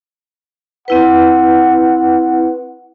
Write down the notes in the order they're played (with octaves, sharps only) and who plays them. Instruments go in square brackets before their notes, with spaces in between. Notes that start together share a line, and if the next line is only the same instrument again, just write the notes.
[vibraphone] C4 E4 B4 [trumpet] F#5